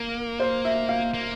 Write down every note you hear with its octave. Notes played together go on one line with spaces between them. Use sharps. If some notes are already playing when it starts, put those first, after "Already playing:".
Already playing: A#3 A#4
C5
E5
F5
A#3